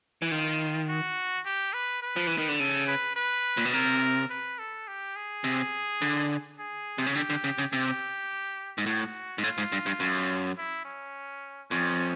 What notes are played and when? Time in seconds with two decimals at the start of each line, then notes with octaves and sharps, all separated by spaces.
0.22 E3
0.31 D#3 F4
0.89 F#4
1.45 G4
1.74 B4
2.02 B4
2.16 F3
2.27 E3
2.38 D#3
2.49 D3
2.60 C#3 A4
2.87 B4
3.16 B4
3.57 A#2
3.65 B2
3.73 C3 A#4
4.30 B4
4.59 A4
4.88 G4
5.16 G#4
5.44 C3
6.02 D3
6.59 G#4
6.98 C3
7.07 C#3
7.15 D3 G4
7.30 D3
7.44 C#3
7.58 C#3
7.73 C3 G4
8.78 G#2
8.86 A2 F#4
9.38 G#2
9.43 A2 F4
9.58 G#2
9.72 G2
9.86 G2
10.00 F#2
10.58 E4
10.85 C#4
11.71 F2 C#4